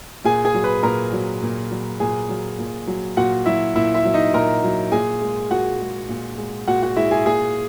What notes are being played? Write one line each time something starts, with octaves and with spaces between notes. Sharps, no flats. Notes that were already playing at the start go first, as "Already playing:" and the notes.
A#2 G#4 G#5
G#4 G#5
F#3
B4 B5
A#2 A#4 A#5
F#3
A#2
F#3
A#2 G#4 G#5
F#3
A#2
F#3
A#2 F#4 F#5
F#3 E4 E5
A#2 E4 E5
E4 E5
F#3
D#4 D#5
A#2 A#4 A#5
F#3
A#2 G#4 G#5
G#3
A#2 F#4 F#5
G#3
A#2
G#3
A#2 F#4 F#5
F#4 F#5
G#3 E4 E5
G#4 G#5
A#2 G#4 G#5